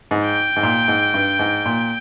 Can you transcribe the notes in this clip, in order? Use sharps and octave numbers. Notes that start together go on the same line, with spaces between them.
G#2
G5
G#2
A#2
G#2
G2
G#2
A#2